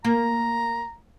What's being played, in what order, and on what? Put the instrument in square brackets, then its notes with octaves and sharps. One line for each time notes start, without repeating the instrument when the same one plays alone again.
[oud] A#3 [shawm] A#5